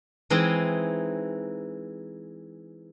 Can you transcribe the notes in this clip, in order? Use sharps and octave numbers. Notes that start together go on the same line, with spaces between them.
E3 G#3 C4 D#4